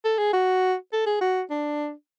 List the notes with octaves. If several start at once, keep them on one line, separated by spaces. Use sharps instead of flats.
A4
G#4
F#4
A4
G#4
F#4
D4